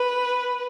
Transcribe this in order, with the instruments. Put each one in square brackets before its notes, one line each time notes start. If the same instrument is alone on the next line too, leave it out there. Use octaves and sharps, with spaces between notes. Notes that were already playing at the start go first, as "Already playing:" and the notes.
Already playing: [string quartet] B4